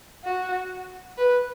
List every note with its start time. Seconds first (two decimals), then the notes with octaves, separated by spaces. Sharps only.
0.25 F#4
1.18 B4